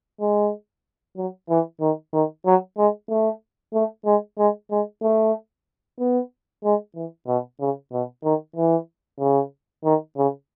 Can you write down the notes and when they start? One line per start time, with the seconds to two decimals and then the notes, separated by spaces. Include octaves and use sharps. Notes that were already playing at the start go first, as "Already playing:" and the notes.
0.20 G#3
1.17 F#3
1.49 E3
1.80 D#3
2.13 D#3
2.45 F#3
2.78 G#3
3.10 A3
3.74 A3
4.05 G#3
4.38 G#3
4.71 G#3
5.03 A3
5.99 B3
6.64 G#3
6.95 E3
7.27 B2
7.60 C#3
7.92 B2
8.23 D#3
8.56 E3
9.20 C#3
9.84 D#3
10.17 C#3